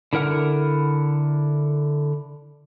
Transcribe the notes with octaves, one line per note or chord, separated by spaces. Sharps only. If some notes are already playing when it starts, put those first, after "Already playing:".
D3 E4 A#4 F#5 F6